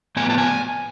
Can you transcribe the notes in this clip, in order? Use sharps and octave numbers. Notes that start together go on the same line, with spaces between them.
A2 F3 B3 G#5
A5
G#5